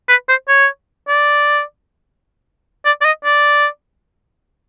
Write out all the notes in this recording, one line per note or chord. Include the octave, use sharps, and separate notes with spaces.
B4
C5
C#5
D5
D5
D5
D#5
D5